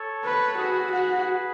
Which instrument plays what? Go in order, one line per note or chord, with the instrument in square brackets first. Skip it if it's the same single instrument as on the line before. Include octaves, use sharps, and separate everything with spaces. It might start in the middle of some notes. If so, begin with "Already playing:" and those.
Already playing: [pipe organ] A4 C#5
[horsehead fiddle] B4
[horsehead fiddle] F#4 [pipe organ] G#4 B4
[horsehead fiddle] F#4